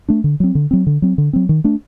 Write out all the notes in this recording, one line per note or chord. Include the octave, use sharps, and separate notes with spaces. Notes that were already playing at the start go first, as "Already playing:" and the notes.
A3 D4
D3
F#3 C4
D3
F#3 C4
D3
F#3 C4
D3
F#3 C4
D#3
A3 D4